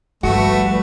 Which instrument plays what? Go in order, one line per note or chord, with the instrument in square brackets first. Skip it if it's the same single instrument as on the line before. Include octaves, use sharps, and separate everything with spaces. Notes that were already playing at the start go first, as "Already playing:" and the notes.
[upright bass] G1 F3 [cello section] G3 B4 [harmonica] A3 [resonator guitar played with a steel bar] F#4